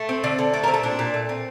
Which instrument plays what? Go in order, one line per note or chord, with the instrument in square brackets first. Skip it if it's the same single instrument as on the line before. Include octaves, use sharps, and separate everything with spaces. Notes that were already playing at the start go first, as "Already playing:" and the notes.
Already playing: [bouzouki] A3
C4
D3
D3
A3 D5
A#4
C4
A4
A#2 D4
A#2
A3
C4